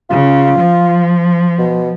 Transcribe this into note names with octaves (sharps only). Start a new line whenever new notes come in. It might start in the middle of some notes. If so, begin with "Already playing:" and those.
C#3 F4
F3
B2